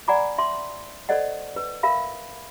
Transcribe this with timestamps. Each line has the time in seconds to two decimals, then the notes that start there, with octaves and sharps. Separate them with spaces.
0.08 D5 F#5 G#5 A#5 B5 D6
0.38 E5 C6 D6
1.09 A4 C5 D5 D#5 F#5
1.56 B4
1.83 A#4 E5 F5 B5